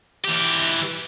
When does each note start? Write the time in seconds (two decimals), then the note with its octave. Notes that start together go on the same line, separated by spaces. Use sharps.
0.25 E3 G4